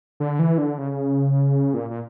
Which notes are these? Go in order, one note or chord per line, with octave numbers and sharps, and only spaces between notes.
D3
E3
D3
C#3
A#2
A#2